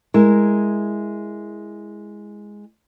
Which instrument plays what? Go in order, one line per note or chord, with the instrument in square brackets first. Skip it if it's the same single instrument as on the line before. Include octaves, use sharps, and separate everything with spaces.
[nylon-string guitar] G#3 E4 A#4